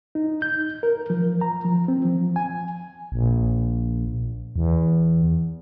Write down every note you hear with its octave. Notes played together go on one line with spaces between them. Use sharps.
D#4
G6
A#4
F3
A#5
F3
C4
F3
G#5
A#1
E2